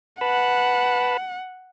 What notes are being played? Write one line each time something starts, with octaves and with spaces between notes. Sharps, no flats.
B4 F#5 A5 B5